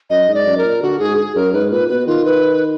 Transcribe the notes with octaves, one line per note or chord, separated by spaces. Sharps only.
F#2 D#5
G#2
D5
F#2
A#4
A#2
D3 F#4
G#2 G#4
G#4
F#2 A#4
G#2 B4
A#2 B4
B2 B4
D#3 F4
B4